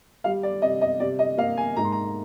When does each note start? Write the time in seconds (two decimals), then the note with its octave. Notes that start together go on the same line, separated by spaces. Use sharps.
0.24 G3 F5
0.43 D5
0.62 C3 D#5
0.81 D#5
1.00 C3 D5
1.19 D#5
1.38 A#3 F5
1.57 G#5
1.76 G#2 A#5
1.84 C6
1.92 A#5